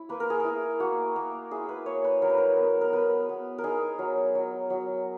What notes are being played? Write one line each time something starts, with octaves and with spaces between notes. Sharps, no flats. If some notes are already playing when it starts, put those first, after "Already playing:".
Already playing: E4
A#3 B4
A#4
G#4
E4 A#4
A#3 F#4
A#3
E4 G#4
B4
A#3 C#5
B4
F#3 A#4
B4
A#4
B3
A#4
B3 B4
B3
A#4
D#4 G#4
F#3
F#3
F#3